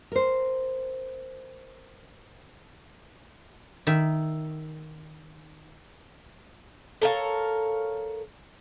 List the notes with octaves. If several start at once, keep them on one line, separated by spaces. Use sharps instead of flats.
A#4 C5
D#3 E5
A4 A#4 C#5 F5